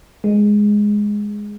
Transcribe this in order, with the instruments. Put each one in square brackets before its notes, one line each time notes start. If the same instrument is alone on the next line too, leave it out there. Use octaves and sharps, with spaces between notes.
[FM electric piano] G#3